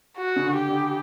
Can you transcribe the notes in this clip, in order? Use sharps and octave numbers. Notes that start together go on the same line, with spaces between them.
F#4
C#3
D3
G4
D3